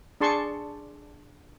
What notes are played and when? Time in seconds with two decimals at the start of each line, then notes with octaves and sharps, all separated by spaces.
0.21 D4 G#4 A5 C6 C#6